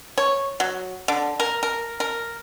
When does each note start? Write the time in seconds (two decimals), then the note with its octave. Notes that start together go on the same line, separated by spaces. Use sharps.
0.18 C#5
0.60 F#3
1.08 D3
1.40 A#4
1.63 A#4
2.00 A#4